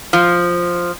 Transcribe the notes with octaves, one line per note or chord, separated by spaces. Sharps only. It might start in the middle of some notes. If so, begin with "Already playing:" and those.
F3